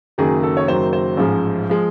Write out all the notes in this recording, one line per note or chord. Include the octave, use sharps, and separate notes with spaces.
F#1 F#2 D#3 F#3 G#4
A4
C#5
F#1 F#2 D#3 F#3 C5
C5
A1 G#2 F3 G#3
F3 G#3